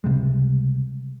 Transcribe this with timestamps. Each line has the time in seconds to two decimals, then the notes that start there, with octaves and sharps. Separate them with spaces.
0.04 C#2 C3 G3 G#3